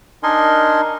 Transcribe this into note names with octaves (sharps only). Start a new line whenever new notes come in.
D4 D#4 A#4 D#5 G#5 C6